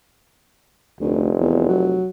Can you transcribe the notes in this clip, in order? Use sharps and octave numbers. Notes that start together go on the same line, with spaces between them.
F1 D2
E2
F#3